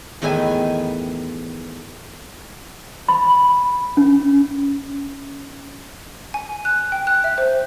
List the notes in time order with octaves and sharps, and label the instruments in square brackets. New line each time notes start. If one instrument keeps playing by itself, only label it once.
[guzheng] E2 A2 D#3 B4 E5 G#5
[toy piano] B5
C#4
[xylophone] G#5
F#6
G5
F#6
E5
C5